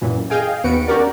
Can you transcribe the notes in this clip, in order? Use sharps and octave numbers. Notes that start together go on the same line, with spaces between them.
F#2 A#2 E3
G#4 D#5 F5 G5 G#5
D#2 B3 F#4 B4 C#7 D7
C#4 F#4 G4 A#4 D5